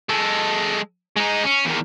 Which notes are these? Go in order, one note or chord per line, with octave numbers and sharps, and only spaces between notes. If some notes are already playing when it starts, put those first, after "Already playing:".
G#3 A4
G#3 D#4
C#4
E2 D#3